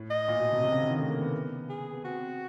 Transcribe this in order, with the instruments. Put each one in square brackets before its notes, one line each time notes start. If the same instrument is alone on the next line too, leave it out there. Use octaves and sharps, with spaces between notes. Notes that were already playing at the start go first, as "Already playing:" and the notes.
Already playing: [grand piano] A2
[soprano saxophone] D#5
[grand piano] A#2
B2
C3
C3
C#3
D3
D#3
A3
A#3
B3
[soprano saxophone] G#4
[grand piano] B3
[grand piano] C4 [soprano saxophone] F#4